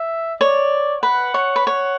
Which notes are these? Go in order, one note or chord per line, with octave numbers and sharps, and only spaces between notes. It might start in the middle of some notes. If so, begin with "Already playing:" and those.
Already playing: E5
C#5 D5
B4 F#5
C#5
B4
C#5 F#5